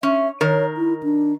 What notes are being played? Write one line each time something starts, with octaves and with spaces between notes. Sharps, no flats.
C#4 E5
D#3 A#4 C#5
E4
D4